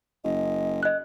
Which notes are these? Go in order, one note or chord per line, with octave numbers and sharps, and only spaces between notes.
F#1 D#5
D#5 F#6